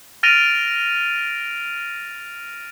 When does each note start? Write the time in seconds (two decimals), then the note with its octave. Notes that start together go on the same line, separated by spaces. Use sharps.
0.23 F6 A6 A#6 D7 D#7 F7